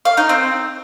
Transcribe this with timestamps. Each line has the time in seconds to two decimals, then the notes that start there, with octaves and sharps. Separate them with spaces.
0.05 F5
0.17 D#4
0.29 C4